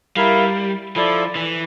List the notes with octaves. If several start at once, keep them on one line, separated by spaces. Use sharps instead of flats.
G3 E4 A#4 F5
F3 E4 A4 D5
E3